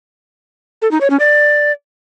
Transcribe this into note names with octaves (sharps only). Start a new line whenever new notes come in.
A4
D#4
C#5
C#4
D5